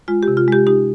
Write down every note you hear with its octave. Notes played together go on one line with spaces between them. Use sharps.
G#3 F4
G4
C3
F4
G#3 G4
D#4 G4